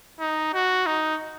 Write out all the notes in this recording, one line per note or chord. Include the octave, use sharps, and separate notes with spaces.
D#4
F#4
D#4